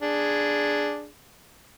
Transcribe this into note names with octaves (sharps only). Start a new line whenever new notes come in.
D4 G#4